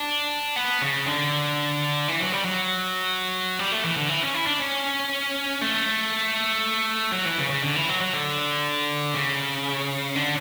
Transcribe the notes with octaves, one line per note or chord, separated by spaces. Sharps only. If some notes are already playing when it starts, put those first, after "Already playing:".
Already playing: D4
B3
C#3
D3
E3
F#3
G3
F#3
G3
A3
E3
D3
E3
C#4
E4
D4
C#4
A3
F#3
E3
C#3
C#3
D3
E3
F#3
F#3
D3
C#3
D3